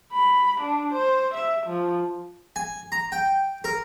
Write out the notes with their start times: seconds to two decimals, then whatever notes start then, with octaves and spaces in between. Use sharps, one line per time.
0.13 B5
0.61 D4
0.93 C5
1.35 E5
1.67 F3
2.56 G#5
2.92 A#5
3.12 G5
3.64 A#4